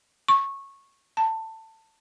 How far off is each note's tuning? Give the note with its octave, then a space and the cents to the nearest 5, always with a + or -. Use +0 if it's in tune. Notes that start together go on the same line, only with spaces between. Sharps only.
C#6 -15
A5 +20